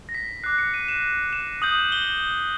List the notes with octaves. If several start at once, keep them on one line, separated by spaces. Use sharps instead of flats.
A#6
B6
D6 F#6 C7
C#7
D#7
E7
E7
D#6 G6 F#7
G7